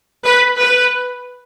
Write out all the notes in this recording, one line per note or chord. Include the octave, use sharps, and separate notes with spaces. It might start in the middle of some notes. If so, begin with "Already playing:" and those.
B4
B4